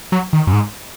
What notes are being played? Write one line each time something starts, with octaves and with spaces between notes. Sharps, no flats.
F#3
D#3
F#2
G#2